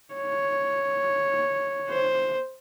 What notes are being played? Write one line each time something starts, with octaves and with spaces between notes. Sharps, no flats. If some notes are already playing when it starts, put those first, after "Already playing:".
C#5
C5